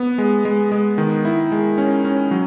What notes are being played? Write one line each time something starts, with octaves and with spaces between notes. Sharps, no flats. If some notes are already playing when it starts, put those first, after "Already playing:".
Already playing: B3
G#3
G#3
G#3
D#3
E4
G#3
C#4
C#4
F#3